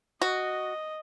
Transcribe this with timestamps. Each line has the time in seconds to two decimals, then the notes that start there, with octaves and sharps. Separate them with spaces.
0.22 F#4 D#5